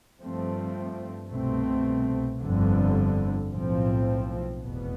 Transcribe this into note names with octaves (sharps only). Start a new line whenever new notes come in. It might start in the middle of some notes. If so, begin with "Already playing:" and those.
G2 F3 A3 C4
C2 B2 A3 C4
G1 F2 D3
B1 A2 F3 C4
F1 E2 B2 B3